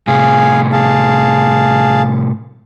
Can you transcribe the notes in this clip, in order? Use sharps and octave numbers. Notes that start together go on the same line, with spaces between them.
A2 C3 G#4 F5 G#5
G#4 F5 A5